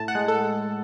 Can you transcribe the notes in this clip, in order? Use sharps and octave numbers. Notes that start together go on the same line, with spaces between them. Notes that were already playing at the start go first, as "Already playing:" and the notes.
Already playing: A2 A5
F#5
G#3
A4